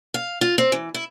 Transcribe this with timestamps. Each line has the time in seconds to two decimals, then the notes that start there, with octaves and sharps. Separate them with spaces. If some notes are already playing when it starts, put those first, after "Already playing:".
0.14 F5
0.41 F4
0.58 C4
0.72 E3
0.94 E4